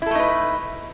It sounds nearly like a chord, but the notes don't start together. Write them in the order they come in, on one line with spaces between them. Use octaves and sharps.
E4 A4 A3 D#4 B4